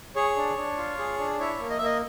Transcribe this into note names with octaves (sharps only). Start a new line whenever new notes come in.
G#4 C#5
D4
D4
F4
G#4
D4
E4 C#5
A#3
D#5
E5
A#3 D#5